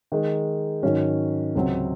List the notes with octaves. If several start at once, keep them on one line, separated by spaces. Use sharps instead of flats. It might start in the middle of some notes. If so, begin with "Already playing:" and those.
D#3 G#3 D#4
G#2 D#3 F#3 C#4 F#4
C#2 C3 F#3 C4